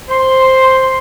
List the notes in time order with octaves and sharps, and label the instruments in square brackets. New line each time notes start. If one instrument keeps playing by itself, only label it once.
[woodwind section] C5 C6